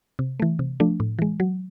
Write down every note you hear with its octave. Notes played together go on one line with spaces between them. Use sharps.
C3
E3 A3
C3
F3 A3 D4
A2
E3 G#3
F#3